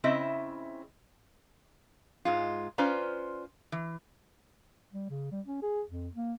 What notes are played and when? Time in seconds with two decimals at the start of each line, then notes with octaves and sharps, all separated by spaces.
0.04 C#3 C4 E4 D#5 E5
2.25 G#2 G#3 F4
2.78 C#4 F4 B4 C5 D5 A#5
3.72 E3
4.93 G3
5.10 C#3
5.32 G3
5.46 C#4
5.62 G#4
5.90 F2
6.15 A#3